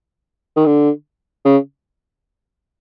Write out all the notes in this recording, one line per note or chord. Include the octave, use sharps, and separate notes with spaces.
D#3
D3
C#3